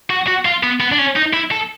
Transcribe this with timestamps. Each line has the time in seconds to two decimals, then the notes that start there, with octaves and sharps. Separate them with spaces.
0.10 F#4
0.28 F#4
0.45 F4
0.63 B3
0.80 B3
0.92 D4
0.99 C#4
1.16 D#4
1.34 E4
1.51 A4